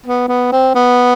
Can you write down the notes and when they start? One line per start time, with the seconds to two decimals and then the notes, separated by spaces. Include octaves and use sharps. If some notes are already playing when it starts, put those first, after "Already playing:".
0.06 B3
0.29 B3
0.53 C4
0.75 B3